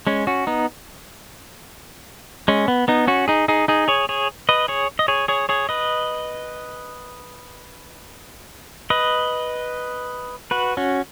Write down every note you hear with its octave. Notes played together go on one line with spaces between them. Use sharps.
G#3 C#4
C#4 F#4
B3 D#4
G#3 C#4
B3
B3 D#4
C#4 F#4
D#4 G#4
D#4 G#4
D#4 G#4
G#4 C#5
G#4 C#5
B4 D#5
G#4 C#5
D#5
G#4 C#5
G#4 C#5
G#4 C#5
B4 D#5
B4 D#5
F#4 B4
C#4 F#4